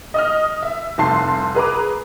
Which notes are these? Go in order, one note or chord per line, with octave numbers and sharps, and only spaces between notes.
D#5 D#6 F6
E5
F1 C2 A5 C6 C7
G#4 B4 A#5 D6